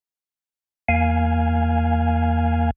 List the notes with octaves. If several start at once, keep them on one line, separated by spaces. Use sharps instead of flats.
E2 A#3 F5 G#5